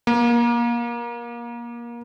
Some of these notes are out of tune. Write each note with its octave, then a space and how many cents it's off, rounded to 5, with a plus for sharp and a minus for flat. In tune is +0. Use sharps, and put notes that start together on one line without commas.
A#3 +25